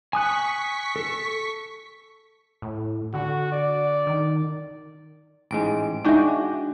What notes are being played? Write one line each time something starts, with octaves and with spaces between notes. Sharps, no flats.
G#5 C#6 D#6 F#6 B6
A4
A2
D3 F#4
D5
D#3
A1 G#2 G#3 D7
G#3 D4 D#4 F#4 E5 G5